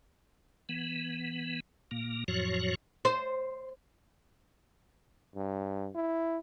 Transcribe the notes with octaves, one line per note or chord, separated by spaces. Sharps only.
E3 B3
A#2 A#3
F2 A2 F3 F#3 F#4 C#5
C5
G2
E4